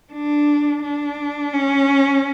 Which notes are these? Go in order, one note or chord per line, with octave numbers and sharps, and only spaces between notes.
D4
D4
C#4